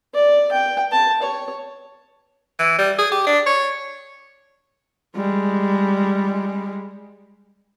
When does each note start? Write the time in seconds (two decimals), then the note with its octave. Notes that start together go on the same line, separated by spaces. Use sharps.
0.14 D5
0.52 G5
0.92 A5
1.22 C#5
2.59 E3
2.79 G3
2.99 G#4
3.12 G4
3.27 D4
3.46 C#5
5.16 G3 G#3